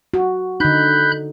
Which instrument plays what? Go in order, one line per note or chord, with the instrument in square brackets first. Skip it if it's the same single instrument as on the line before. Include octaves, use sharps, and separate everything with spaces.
[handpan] F#4
[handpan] D3 D#4 [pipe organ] B5 F#6 G6